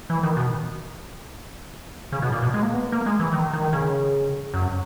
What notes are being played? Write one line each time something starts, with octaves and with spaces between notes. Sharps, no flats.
E3
D#3
B2
C#3
B2
A#2
B2
G#3
A#3
B3
A#3
G#3
E3
D#3
D#3
C#3
F#2